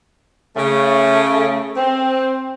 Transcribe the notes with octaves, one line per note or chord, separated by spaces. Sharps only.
C#3 A3
C4